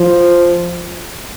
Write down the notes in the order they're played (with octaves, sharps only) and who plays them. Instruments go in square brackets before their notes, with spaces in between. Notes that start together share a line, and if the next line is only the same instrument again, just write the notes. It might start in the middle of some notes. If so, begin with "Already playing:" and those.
Already playing: [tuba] F3